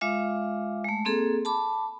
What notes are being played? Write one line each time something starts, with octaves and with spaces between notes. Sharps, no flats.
G#3 F4 E5 F5 D6
G#3 A3
A#3 C4 G#4 A4
A5 B5 D6